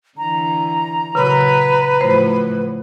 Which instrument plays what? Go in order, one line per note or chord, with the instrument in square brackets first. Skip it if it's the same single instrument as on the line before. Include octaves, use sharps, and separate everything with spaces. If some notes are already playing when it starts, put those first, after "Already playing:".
[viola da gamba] D3 E3 [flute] A#5
[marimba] A#2 C#3 [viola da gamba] F#3 [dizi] B4
[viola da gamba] A2 F3 F#3 [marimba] C5